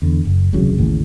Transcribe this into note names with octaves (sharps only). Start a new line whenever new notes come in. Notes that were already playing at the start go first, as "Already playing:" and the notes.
E2 D3
F#1
D#1 C2 C#3 F#3
A1 D#2 A2 C#3